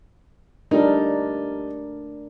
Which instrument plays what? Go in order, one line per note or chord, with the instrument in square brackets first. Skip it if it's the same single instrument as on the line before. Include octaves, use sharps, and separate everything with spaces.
[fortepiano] G3 D#4 [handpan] A3 D4 A#4